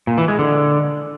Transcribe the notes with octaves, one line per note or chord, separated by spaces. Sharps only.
A#2
E3
G#3
D3